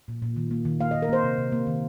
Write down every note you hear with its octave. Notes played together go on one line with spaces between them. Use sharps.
A#2
A#2
D#3
A#3
D#3
A#3 F5
D#3 D#5
A#4
A#3 C5
C3
C3
A#3
D#3